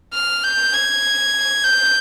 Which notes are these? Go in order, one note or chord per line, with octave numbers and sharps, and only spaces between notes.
F6
G6
G#6
G6